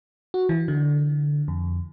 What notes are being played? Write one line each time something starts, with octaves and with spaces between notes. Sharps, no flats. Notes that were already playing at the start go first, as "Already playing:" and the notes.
F#4
E3
D3
F2